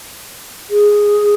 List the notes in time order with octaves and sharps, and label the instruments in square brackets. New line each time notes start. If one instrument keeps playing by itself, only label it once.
[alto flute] G#4